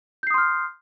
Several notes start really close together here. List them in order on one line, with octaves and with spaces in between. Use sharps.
G6 C7 D#6 C6 F6